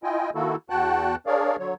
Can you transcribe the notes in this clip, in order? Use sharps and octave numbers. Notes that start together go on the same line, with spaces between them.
E4 F4 D#5 G5 G#5
D#3 A#3 E4 F#4 A4
E2 F#4 F#5 G5 A5 F#6
D4 G#4 A#4 C#5 D5 F5
D3 F#3 C#5